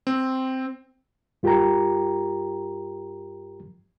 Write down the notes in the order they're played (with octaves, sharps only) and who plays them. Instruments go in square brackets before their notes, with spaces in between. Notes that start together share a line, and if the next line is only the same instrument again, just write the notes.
[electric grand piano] C4
[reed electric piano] G2 F4 G4 A#4 G5 A#5